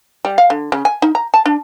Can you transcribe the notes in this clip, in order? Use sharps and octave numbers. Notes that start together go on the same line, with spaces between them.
G3
F5
D3
C#3
G#5
D#4
A#5
A5
D4